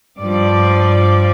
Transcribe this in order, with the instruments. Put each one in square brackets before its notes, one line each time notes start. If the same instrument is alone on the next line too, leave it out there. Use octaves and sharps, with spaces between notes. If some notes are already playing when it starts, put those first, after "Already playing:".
[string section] G2 F3 D5